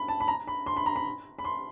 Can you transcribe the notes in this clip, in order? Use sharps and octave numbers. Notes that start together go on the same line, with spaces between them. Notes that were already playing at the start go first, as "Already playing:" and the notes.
Already playing: B5
A5
B5
A#5
B5
C6
B5
A#5
B5
B5
C6